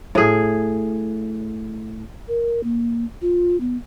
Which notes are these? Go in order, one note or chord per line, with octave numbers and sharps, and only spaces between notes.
A2 G#4
A#4
A#3
F4
B3